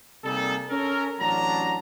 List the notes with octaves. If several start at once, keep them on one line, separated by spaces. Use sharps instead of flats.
C3 G3 A#3 D#4 G#4 A4
C#4 A4 A#4
A1 F#3 D4 A5 A#5